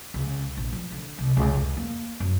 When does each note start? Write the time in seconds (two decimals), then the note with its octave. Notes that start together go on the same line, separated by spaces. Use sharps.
0.14 C#2
0.57 A#1
0.72 F3
0.92 D3
1.18 C2
1.37 C#2
1.54 F2
1.77 A#3
2.20 F#2